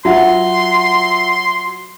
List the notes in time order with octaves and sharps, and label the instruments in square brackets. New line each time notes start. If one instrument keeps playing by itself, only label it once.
[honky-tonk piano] F#3 [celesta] F4 E5 F#5 [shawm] C6